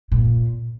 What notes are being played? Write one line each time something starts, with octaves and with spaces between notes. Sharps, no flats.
A#2